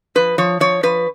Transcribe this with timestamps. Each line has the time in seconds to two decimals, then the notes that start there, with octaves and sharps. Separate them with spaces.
0.15 F3 B4
0.38 F3 C#5
0.60 F3 C#5
0.83 F3 B4